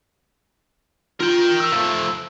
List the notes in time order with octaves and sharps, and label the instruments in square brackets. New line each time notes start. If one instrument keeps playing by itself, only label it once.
[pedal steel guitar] F4 [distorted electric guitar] A#4 G5
[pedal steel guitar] E6
[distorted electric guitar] F3 A3